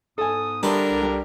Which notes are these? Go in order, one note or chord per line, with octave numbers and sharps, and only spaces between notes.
G#2 B3 A4 G#5 D#6
D3 G3 D4 A#4 B4 D#5 E5 C6
C2
G3